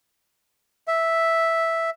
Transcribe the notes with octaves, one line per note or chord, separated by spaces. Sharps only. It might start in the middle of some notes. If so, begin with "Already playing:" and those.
E5